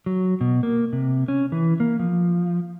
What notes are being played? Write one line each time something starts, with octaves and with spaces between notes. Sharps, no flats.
F#3
B2
A#3
C3
C#4
E3
A#3
F3